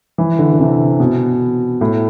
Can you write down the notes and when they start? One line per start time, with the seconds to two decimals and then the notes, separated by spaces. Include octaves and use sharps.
0.18 E3
0.39 D3
0.53 D3
0.59 C3
1.00 B2
1.81 A2